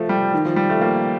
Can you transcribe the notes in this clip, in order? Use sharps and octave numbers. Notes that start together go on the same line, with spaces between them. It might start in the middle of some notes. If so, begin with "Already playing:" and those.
Already playing: F3 A3
G3
D#3
F3
G3
A3
A#3